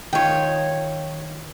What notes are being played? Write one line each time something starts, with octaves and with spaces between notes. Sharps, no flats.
D#3 D#4 F4 C#5 G5